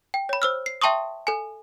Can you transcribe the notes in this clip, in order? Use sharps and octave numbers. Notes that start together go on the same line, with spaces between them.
G5
C#5 B5
C5 E6 F6
C7
E5 G5 A5 C6 C#6 D#6
A4 G#5